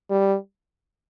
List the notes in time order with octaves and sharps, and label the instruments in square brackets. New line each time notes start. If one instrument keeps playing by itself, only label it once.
[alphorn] G3